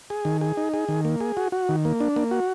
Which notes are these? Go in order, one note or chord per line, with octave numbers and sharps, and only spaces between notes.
G#4
D#3
G#4
D#4
G#4
D#3
A#3
G#4
F#4
F#4
D#3
A#3
D4
A#3
F#4